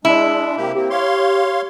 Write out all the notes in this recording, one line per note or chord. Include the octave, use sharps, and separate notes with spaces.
G#3 D4 E4
C3 A#3 G4
A#3 C4 G4
C#5 F5 C6